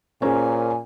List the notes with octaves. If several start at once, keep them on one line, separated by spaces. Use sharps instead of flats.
A#2 C#4 G#4 A#4 C5 G#5 A#5